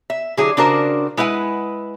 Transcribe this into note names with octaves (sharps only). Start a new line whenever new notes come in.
E5
D3 F#3 E4 F#4 G#4
C#3 D4 F#4 A#4 C5
G#3 E4 B4 F#5 G#5